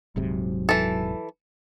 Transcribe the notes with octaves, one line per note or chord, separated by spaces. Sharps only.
D#1 G#2 C3 F#3
E3 A4